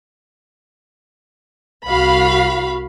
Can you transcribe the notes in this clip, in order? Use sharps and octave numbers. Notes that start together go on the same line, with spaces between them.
C2 F#4 F5 B5